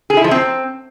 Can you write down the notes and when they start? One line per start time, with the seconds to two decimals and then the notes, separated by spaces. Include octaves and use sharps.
0.10 G#4
0.17 E4
0.24 F3
0.31 C4